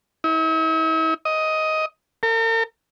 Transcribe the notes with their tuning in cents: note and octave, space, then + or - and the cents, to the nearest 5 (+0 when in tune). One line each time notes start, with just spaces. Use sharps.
E4 -45
D#5 +10
A#4 -45